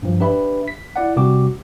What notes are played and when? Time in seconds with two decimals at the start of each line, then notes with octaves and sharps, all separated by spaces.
0.02 G2 F3
0.20 D4 G4 B4 E5 B5
0.68 B6
0.96 E4 D5 F#5
1.16 C3 G3 F#4 G4 D6